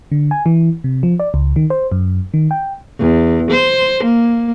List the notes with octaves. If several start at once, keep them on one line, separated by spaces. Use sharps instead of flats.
D3
G#5
E3
C3
F3
D5
C#2
D#3
C5
F#2
D#3
G5
E2
C5
A#3